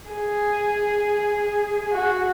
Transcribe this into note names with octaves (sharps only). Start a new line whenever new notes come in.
G#4
F#4